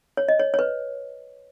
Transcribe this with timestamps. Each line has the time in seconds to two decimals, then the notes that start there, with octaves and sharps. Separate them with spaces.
0.17 C#5
0.28 D#5
0.39 C#5
0.54 C#5
0.59 B4